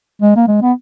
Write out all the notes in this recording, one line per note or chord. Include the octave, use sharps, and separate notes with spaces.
G#3
A#3
G#3
B3